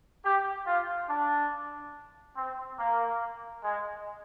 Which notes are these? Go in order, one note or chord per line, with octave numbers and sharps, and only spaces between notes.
G4
F4
D4
C4
A#3
G#3